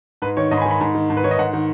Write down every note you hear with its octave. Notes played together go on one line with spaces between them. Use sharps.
G#2 B4
D#3 C#5
G#2 D#5
B5
G#5
D#3
B5
G#2
D#3
G#2
B4
D#3 C#5
D#5
G#2 F#5
D#3